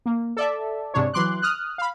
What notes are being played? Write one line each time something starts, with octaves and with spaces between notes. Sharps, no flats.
A#3
A4 D5 E5
G#2 C3 D4 C#5
E3 F#3 C6 D6 F#6
D#6 F6 F#6
F5 B5